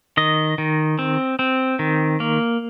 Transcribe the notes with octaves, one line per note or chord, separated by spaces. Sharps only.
D#3 D#5
D#3
C4
C4
D#3
A#3